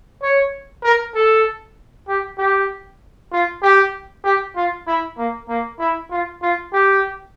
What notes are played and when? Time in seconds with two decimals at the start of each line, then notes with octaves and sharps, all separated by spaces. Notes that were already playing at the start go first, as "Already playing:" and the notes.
0.22 C#5
0.83 A#4
1.14 A4
2.08 G4
2.38 G4
3.32 F4
3.62 G4
4.24 G4
4.56 F4
4.87 E4
5.17 A#3
5.49 A#3
5.79 E4
6.11 F4
6.42 F4
6.73 G4